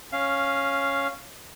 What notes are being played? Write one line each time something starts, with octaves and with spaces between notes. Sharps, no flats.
C#4 F5